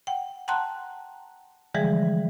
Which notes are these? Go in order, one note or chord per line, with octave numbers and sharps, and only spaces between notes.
F#5 G5
F#5 G5 A5 A#5 C6 F#6
D3 E3 F3 G3 G#3 G#4